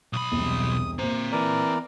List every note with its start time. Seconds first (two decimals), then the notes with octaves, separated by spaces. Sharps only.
0.13 B1 B5 D#6
0.32 E1 C2
0.99 A#2 C4 C5 A#5
1.32 E3 A#4 D5